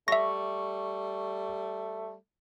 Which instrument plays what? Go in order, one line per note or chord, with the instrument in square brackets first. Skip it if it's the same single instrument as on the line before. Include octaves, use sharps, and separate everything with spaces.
[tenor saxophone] G3 [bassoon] A3 [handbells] E5 A#6 [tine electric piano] C#6